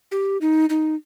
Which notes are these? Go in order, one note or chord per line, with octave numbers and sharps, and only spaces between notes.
G4
D#4
D#4